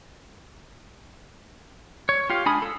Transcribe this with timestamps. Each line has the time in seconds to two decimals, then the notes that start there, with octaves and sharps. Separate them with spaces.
2.09 C#5
2.30 F4 G4 F5
2.46 G#3 D4 G#5 B5 D#6
2.62 A4 E6